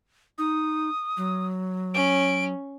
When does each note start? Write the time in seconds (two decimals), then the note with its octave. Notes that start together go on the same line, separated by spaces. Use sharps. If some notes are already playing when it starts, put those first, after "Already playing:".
0.38 D#4 D#6
1.17 F#3
1.94 C#4 D7